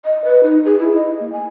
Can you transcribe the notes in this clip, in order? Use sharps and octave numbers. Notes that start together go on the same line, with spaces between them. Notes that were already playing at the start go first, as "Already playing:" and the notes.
D#5
B4
D#4
G#4
E4
D#5
A#3
G#5